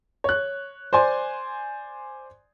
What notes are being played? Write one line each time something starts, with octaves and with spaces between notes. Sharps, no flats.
C#5 F#6
C5 D5 G#5 C6